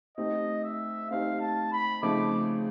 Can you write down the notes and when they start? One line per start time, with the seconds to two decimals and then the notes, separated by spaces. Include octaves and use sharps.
0.17 A3 C4 D#4 G4 D#5
0.64 E5
1.10 A3 C4 D#4 G4 F5
1.41 A5
1.72 B5
2.03 C#3 F3 A3 C4 D#4 D6